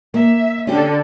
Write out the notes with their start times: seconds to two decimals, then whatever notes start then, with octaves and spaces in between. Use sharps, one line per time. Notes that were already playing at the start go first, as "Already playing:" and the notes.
0.14 A#3 E5
0.67 D3 C#4 D4 G4 A4